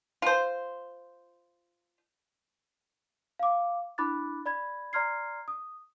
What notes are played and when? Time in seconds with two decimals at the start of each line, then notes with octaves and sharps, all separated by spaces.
0.22 F4 C5
3.39 F5 D6
3.98 D4 E4 B5 D6 F#6 A6
4.46 D5 B5 G#6
4.93 D5 A#5 C6 F6 G#6 C7
5.48 D#6